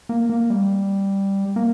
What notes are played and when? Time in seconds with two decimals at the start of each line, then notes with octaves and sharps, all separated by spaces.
0.09 A#3
0.30 A#3
0.50 G3
1.56 A#3